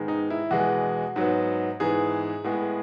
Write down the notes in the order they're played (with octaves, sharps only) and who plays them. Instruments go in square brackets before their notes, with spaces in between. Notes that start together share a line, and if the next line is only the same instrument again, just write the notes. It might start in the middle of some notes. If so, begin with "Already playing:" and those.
Already playing: [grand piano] G#2 D#3 G#3 B3
D#4
E4
E2 B2 G#3 B3 F#4
G#2 F#3 B3
G#2 E3 B3 G#4
A2 G#3 B3